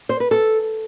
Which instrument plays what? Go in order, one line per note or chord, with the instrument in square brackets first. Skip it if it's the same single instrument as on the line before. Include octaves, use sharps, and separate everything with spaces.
[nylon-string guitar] C5
B4
A4